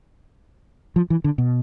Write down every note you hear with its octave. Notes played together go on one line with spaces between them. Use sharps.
F3
E3
D3
B2